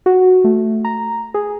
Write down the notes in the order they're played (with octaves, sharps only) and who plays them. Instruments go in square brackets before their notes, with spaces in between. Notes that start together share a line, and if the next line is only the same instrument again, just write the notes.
[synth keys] F#4
A3
A#5
G#4